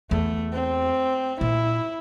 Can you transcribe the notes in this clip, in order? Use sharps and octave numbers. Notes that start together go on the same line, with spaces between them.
E2 A3
C4
A#2 E4